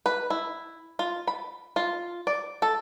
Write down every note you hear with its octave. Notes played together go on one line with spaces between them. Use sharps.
B4
E4
F4
B5
F4
D5
A4